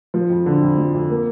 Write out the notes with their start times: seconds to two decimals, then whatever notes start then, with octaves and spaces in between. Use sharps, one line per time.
0.14 F3
0.30 F2
0.46 D3
0.62 F2
0.78 F3
0.94 F2
1.10 A#3